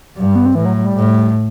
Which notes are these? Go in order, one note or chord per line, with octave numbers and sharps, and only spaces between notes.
G2 F#3
G3
B3
C4
A2 E3
F#3
F#3
G3
A2